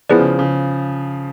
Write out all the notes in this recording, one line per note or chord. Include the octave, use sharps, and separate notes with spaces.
F3 B3 E4 G#4 B4 D5
C#3
C#3